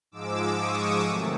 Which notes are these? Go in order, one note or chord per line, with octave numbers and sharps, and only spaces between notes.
G#2 F3 G#3 D6 E6
C#6 D#6
C3 D#3 F#3 A3